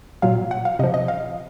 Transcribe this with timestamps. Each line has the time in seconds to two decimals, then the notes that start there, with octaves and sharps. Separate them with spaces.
0.22 A#2 F#3 F5
0.51 F#5
0.65 F5
0.79 C3 F3 D#5
0.94 D#5
1.08 F5